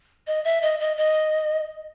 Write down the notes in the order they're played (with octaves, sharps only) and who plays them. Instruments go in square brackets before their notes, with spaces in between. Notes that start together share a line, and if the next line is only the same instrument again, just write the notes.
[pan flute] D#5
E5
D#5
D#5
D#5